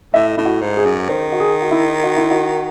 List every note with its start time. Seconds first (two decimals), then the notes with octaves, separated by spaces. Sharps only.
0.14 A2 E5
0.37 A2 E4
0.45 F#4
0.61 G#2
0.77 G#4
0.85 F#2
1.09 D#3 C5
1.32 F#4
1.40 G#4
1.62 F#4
1.71 E4
2.04 F#4
2.17 E4
2.31 F#4